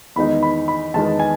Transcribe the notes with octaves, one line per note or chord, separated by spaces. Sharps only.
E2 D#3 G#3 B3 D#4 B5
B5
B5
E2 D#3 G#3 B3 D#4 A5
G#5